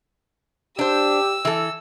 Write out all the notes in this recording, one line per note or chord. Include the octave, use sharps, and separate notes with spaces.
D4 G4 C5 E6
E3 A4